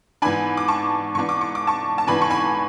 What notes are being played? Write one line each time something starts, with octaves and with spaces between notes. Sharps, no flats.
G#2 E3 B3 D4 G#5 B5
D6
A5 C#6
G#2 E3 B3 D4 C#6
D6
C#6
D6
A5 C#6
A5
G#2 E3 B3 D4 G#5 B5
C#6
G#5 B5